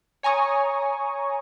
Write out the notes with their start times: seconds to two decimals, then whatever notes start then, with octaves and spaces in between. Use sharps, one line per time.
0.23 C#5 G#5 A#5 C#6 D#6